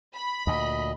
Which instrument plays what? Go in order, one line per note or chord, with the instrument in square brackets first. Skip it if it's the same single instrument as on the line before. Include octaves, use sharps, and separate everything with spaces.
[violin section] B5
[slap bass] D2 A#2 [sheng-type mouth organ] D#5